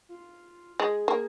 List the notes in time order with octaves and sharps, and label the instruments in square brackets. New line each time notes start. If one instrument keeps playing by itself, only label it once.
[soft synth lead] F4
[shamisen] G#3 [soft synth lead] G#4
[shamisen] A#3